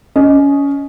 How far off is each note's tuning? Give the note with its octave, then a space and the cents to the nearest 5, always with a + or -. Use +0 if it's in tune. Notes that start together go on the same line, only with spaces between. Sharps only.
C#4 +20 D#5 +0